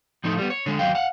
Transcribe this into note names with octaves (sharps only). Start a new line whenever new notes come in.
A2 F3 A3 D#4
G3 B3
C#5
D3 G#3
D#2 F#3 F5 G5
F5 F#5